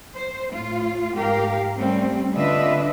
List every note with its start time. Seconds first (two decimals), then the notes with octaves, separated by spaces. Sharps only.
0.16 C5
0.53 A2 F4
1.16 G#2 G4 A#4 F5
1.77 G3 A3 C4 C#4
2.33 D3 D4 F4 B4 D#5 E5